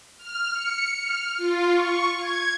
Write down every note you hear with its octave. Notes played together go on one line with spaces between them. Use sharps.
F6
C#7
F6
F4
C#6
G#6